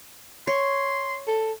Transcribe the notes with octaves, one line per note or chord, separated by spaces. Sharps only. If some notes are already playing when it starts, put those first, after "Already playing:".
C#5 C6
A4